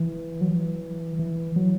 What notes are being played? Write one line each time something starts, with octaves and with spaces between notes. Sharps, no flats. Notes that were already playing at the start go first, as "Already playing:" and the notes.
Already playing: E3
F#3
E3
E3
F#3